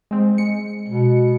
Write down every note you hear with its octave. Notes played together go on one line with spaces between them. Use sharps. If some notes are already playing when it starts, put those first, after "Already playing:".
G#3 C4
G#3 C#7
B2